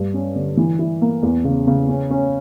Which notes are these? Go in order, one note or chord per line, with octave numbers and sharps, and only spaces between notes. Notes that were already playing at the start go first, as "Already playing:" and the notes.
Already playing: G2
C#4
D3
E3
E4
A#3
E2
C#3
C#3
C#4
C#4